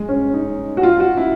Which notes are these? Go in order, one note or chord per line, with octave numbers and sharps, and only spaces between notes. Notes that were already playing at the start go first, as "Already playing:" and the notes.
Already playing: G#3
C#4
D#4
F#4
F4
F#4
E4